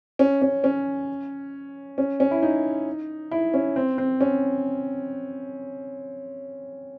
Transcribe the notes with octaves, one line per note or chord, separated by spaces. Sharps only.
C#4
C#4
C#4
C#4
C#4
E4
D#4
E4
C#4
C4
C4
C#4